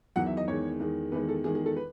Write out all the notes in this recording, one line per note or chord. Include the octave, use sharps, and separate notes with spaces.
E2 D#3 F#3 F#5
E5
D#5
E2 D#3 G#3 C#5
E2 D#3 G#3
E2 D#3 G#3 B4
A4
E2 D#3 G#3 G#4
G#4
A4
B4